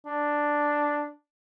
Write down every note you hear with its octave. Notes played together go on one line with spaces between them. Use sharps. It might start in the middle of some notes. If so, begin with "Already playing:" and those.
D4